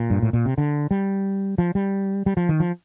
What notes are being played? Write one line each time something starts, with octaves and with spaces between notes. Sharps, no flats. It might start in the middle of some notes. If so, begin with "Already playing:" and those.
Already playing: A#2
G2
A2
A#2
C3
D3
G3
F3
G3
G3
F3
D#3
F3